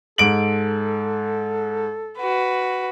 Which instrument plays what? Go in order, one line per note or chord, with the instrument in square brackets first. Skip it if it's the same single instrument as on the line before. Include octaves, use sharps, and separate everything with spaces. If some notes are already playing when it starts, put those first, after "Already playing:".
[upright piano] G#2 D7 F#7 [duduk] A4
[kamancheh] F#4 B4